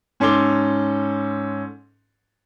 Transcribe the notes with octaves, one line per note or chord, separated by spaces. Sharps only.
G#2 C#4 A4 C6 D6 G7